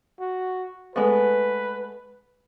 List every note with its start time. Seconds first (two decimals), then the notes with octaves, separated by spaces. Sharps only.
0.20 F#4
0.96 G#3 A3 B3 B4